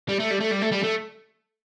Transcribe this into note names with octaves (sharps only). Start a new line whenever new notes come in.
G3
A3
G3
A3
G3
A3
G3
A3